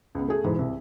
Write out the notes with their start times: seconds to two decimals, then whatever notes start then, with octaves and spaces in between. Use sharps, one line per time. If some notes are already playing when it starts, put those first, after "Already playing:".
0.15 C#2 B3
0.28 A3 G#4
0.44 E1 G#2 E3
0.59 C2